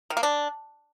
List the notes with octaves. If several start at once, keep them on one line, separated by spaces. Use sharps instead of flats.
D#3
A#3
D4